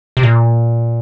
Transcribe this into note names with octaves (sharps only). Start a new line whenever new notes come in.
C3
A#2